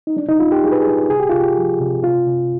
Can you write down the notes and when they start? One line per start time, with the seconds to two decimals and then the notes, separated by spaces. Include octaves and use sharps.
0.07 D#4
0.16 G3 D4
0.28 D#4
0.40 G3 F4
0.52 G4
0.63 G3 G#4
0.72 B4
0.82 G#4
0.87 G3
1.10 C3 G#4
1.20 G4
1.29 C3 F4
1.40 G4
1.57 F3
1.80 C3
2.03 C3 F4
2.27 C3